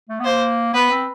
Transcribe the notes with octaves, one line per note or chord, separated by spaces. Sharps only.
A3
B3
A#3 C5
B3 B4
C4